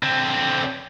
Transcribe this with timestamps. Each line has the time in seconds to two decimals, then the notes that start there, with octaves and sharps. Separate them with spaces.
0.03 D3 C4